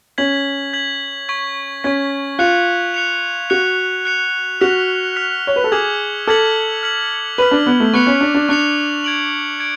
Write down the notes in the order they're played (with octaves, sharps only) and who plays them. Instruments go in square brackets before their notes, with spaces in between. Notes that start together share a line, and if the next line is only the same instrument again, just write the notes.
[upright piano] C#4 [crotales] G#6 B6 F#7
[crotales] G#6 B6 F#7
C#6 G#6 B6
[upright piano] C#4 [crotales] C#6 G#6 B6
[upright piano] F4 [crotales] F#6 C#7 F7
[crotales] F#6 C#7 F7
[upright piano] F#4 [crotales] F#6 C#7 F7
[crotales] F#6 C#7 F7
[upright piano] F#4 [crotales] F6 B6 F7
[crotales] F6 B6 F7
[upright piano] C#5
B4
A4
[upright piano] G#4 [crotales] D6 F6 G#6 B6 F#7
[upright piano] A4 [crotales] D6 F6 G#6 B6 F#7
[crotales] F6 B6 F#7
[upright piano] B4 [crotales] F6 B6 F#7
[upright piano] D4
B3
A3
[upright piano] B3 [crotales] C#6 F#6 C#7 F7
[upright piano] C#4
D4
D4
[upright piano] D4 [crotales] C#6 F#6 C#7 F7
[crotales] G#6 D7 F#7
G#6 D7